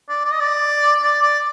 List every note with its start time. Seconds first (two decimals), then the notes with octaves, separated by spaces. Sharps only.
0.09 D5
0.25 D5
0.32 D#5
0.40 D5
1.02 D5
1.22 D5